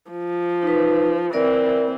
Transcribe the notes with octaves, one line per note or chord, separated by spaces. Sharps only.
F3
D#4 B4
E3 C4 A#4 D5 E5